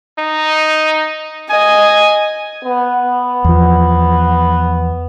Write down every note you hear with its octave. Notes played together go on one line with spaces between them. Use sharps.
D#4
D#5 G#5
B3
E2 F3